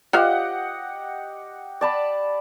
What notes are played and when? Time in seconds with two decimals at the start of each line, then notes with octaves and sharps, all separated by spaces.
0.13 F4 G4 C5 D#5 F5 F#5
1.81 D5 A5 B5